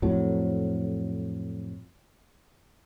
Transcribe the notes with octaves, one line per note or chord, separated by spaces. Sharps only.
F2 A2 F#3